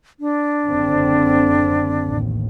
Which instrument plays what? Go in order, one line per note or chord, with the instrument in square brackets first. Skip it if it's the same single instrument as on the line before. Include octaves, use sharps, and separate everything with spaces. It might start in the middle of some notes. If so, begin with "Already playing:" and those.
[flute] D4
[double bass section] F#1 D3 C4
A1 D#2